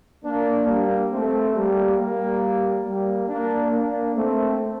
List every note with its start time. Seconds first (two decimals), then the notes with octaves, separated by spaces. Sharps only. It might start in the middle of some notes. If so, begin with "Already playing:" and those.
0.25 A#3 D4
0.68 G3 A#3
1.12 A3 C4
1.55 G3 A#3
1.98 G3 A#3
2.85 G3 A#3
3.28 A#3 D4
3.72 A#3 D4
4.15 A3 C4